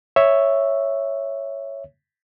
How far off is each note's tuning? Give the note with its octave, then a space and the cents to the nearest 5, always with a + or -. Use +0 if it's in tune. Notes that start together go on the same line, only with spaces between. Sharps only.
C#5 +0 E5 +0